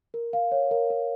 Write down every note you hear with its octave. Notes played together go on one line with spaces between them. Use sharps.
A#4
F5
C#5
A#4
A#4